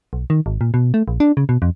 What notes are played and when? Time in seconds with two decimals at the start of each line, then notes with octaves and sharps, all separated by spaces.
0.13 B1
0.30 D#3
0.46 G#1
0.61 A#2
0.74 B2
0.94 A3
1.08 A#1
1.20 D4
1.37 C#3
1.49 B2
1.62 F2